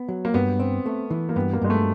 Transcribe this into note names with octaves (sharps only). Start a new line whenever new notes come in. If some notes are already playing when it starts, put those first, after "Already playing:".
Already playing: B3
F#3
A#3
G2 B3
C4
A3
E3
A#3
G2 B3
A#3
G2 G#3
A3